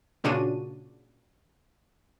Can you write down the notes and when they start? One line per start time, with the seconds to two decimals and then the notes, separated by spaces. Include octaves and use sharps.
0.24 A#2 C#3 D4 F4 F#4 D#7